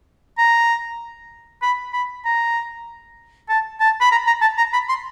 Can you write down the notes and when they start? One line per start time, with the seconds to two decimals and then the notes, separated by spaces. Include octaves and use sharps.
0.38 A#5
1.62 B5
1.93 B5
2.25 A#5
3.49 A5
3.80 A5
4.01 B5
4.12 A#5
4.27 A#5
4.42 A5
4.58 A#5
4.73 B5
4.89 C6